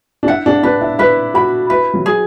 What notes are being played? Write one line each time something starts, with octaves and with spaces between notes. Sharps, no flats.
D4
E4 F#5
D4
D4 B4
E4
E4 B4
F#4 B5
E4 B4
F#3
G#4